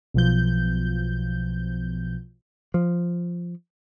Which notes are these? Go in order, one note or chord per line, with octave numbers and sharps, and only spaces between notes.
B1 B2 F3 G6
F3